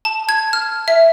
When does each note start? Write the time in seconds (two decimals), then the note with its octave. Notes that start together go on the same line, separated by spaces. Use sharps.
0.05 A5
0.29 G#6
0.53 F6
0.88 E5